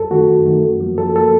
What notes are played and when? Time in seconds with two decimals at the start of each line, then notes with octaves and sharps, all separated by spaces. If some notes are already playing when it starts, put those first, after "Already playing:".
Already playing: F#2 A4
0.10 D#3 A3 F#4
0.28 F#2
0.46 D#3 A3
0.63 F#2
0.80 F3 A#3
0.98 F#2 A4
1.15 F3 A#3 A4